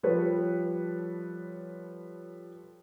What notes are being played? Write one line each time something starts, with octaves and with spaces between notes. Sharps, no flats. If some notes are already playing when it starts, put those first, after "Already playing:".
F3 G3 A4 B4 C#5